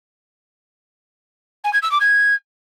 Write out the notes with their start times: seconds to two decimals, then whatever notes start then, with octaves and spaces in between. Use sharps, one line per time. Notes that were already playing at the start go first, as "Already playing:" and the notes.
1.64 G#5
1.73 G#6
1.82 E6
1.91 D6
2.00 G#6